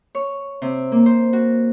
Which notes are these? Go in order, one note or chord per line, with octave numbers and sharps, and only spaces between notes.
C#5
C3
A#3
C5
F#4